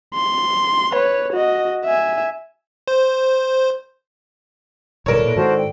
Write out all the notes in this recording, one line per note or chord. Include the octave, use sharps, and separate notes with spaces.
C6
B4 C#5
F#4 D#5
E5 G#5
C5
D1 B2 E3 G3 D4 A4 A#4 C#5
A#2 B4
G#2 D#3 F#4 C5 A5
G5